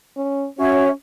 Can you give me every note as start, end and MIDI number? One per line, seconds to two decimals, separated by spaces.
0.17 0.47 61
0.59 0.91 61
0.59 0.86 66
0.59 0.88 73
0.59 0.88 76